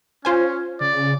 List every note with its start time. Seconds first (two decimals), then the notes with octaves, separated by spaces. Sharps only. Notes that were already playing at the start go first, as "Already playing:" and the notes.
0.25 C#4 F4 C5 G#5
0.81 C#3 D5